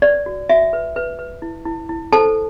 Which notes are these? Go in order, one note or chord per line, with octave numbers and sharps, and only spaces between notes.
B4 D5
F#4
F#4 E5
B4
B4
B4
E4
E4
E4
A4 C5 A5